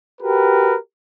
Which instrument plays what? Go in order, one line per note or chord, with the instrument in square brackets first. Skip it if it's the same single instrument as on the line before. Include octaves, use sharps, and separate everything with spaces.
[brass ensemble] F#4 G4 A#4 B4